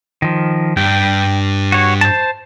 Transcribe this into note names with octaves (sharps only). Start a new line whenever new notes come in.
D#3 F3
G2 G5
F#4 C#5
C5 A5